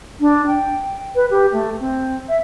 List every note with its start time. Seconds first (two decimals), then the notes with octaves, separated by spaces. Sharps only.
0.21 D4
0.47 G5
1.15 B4
1.31 G4
1.53 A3
1.80 C4
2.29 E5